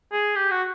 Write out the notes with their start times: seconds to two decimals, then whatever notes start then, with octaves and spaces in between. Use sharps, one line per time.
0.12 G#4
0.36 G4
0.51 F#4